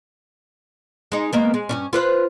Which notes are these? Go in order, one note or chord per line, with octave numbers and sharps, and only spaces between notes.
G#3 D#4
G#3 A#3 B3
G#3
G2 A#2 C#4
F4 B4 C5